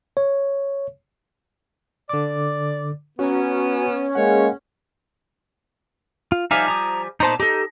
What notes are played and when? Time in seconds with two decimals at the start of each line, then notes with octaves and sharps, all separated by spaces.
0.17 C#5
2.09 D3 D5 D6
3.19 B3 C#4 F#4 A#5
4.15 G#3 A#3 G#4 C#5 F#5
6.32 F4
6.51 F3 G3 D#4 E5 F5 G#5
6.68 A#5 D#6
7.20 A#2 B3 D#4 C5 A5
7.40 D#4 G4 A4